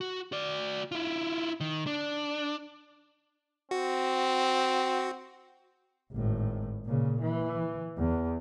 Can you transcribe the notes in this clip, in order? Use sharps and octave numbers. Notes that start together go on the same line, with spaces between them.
F#4
F#4 D5
E4 F4
D#3
D4
C4 F#4
G#1 A2
A#2 C#3
E3
E2